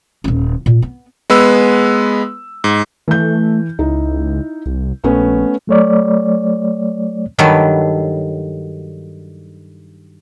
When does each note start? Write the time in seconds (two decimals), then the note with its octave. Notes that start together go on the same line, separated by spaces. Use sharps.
0.24 D#1 C#4
0.66 A#2
0.82 B3
1.30 G#3 B3 B4 E6
2.64 G#2
3.08 E3 A3 G6
3.79 C#2 D#4 E4
4.66 C2
5.04 A#1 A3 B3 C#4
5.67 F#3 A3 C#5 D5
7.39 G2 D#3 F#3 A4 B4